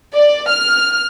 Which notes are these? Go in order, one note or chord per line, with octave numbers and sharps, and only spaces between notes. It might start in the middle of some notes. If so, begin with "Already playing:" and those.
D5
F6